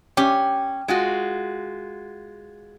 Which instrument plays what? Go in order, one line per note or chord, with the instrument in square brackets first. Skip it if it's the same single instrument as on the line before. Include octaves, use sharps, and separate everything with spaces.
[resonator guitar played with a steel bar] C#4 [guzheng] G4
[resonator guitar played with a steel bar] G#3 F4 F#4